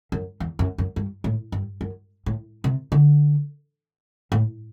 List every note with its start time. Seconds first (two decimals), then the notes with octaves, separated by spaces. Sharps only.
0.12 F#2
0.40 E2
0.59 F#2
0.78 F#2
0.96 G2
1.24 A2
1.52 G2
1.81 F#2
2.26 A2
2.64 C3
2.92 D3
4.32 A2